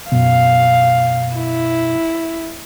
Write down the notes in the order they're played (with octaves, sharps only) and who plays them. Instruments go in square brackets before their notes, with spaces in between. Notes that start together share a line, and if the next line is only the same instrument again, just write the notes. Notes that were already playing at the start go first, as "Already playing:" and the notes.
[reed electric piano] F#2 B2 [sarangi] F5
[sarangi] E4